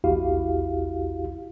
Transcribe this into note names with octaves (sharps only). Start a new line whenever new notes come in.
A#1 E2 E4 F#4 G4 F5